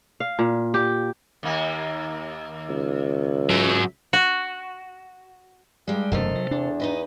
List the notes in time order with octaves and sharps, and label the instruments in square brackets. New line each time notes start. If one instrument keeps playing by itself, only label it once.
[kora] F5
A#2
G4
[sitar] D#2 A#3
[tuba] C#2
[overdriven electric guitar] F#3 E5
[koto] F#4
[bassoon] G2 [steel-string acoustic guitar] G3 G#3
[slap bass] E1 F#2 A3 [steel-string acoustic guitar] C3 A4 F5 [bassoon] D#3
[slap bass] F#3
[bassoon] E2 [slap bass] D4
[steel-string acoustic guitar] D#4 B4 D#5